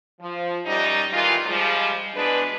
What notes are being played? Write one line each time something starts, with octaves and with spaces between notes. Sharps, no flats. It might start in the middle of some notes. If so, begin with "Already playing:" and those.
F3
F#2 G3 D#4
D#3 E3 G#3 D#4 F4
F3 G3 G#3
B2 E3 G#3 D4 B4